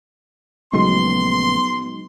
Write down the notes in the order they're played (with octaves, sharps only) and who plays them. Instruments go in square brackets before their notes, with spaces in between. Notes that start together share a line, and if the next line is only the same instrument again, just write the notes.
[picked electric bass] A#1 C#3 A3 [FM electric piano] F#3 G#3 D#4 [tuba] B3 [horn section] C6